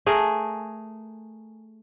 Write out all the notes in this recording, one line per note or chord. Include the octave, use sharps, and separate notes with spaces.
A3 G#4 A#4